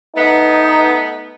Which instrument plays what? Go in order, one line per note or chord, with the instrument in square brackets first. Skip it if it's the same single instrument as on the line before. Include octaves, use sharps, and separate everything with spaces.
[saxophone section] A3 B3 [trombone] D#4